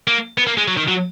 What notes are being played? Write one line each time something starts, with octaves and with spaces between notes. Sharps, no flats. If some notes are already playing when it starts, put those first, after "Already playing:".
A#3
B3
A#3
G#3
F#3
D#3
F#3